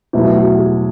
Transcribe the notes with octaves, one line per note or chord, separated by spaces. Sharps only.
E2 B2 F#3 A3 E4
F#4
G#4